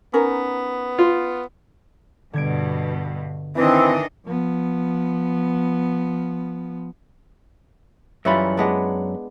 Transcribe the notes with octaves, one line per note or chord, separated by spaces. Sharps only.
B3 C#4 D#4 A#4
F4
G2 B2 D3 G#6 D7
D#3 E3 C4 D4 D#5
F3 B3
F#2 E3 G3 F4 C#5 B5
G#3 B3 D4